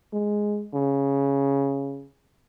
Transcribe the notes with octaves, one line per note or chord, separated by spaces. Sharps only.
G#3
C#3